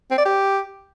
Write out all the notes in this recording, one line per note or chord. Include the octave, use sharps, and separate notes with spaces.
C4
D5
G4